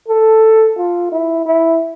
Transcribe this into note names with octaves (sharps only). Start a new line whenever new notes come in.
A4
F4
E4
E4